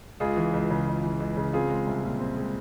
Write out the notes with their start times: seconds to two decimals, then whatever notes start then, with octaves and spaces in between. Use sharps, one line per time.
0.20 C#2 F4 G#4
0.37 E3
0.54 C#2
0.70 C#3
0.87 C#2
1.04 E3
1.20 C#2
1.37 C#3
1.53 C4 F4 G#4
1.70 G#3
1.87 C2
2.03 A#2
2.20 C4
2.37 G#3